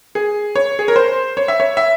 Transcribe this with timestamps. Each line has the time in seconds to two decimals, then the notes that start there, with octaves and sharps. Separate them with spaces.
0.15 G#4
0.55 C#5
0.79 G#4
0.88 A#4
0.96 C5
1.37 C#5
1.48 E5
1.60 C#5
1.77 E5